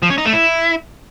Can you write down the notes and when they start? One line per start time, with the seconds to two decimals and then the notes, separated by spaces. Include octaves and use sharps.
0.03 F3
0.10 C#4
0.18 D#4
0.25 A3
0.33 E4